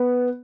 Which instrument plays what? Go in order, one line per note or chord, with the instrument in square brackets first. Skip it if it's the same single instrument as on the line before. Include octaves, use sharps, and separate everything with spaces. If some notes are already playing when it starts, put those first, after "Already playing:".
Already playing: [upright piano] B3